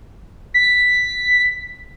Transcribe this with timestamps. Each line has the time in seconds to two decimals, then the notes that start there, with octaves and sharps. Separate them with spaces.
0.54 B6